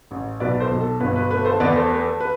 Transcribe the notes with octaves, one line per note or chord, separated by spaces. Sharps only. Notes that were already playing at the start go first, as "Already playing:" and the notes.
A1
B1 B4 D5
A4 C5
B1
A4
G1 B4
B4
A3 B4
A4 C5
E2 B4 D5
A4 C5
A3 B4
A4
B4